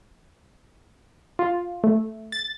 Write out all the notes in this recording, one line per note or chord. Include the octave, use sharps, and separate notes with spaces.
F4
A3
A6